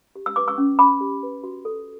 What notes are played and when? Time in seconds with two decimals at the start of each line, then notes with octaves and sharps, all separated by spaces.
0.15 G4
0.26 E6
0.36 B4 D6
0.48 C#6 E6
0.58 C#4
0.79 C#4 B5 D6
1.01 G4
1.23 B4
1.44 F#4
1.65 A4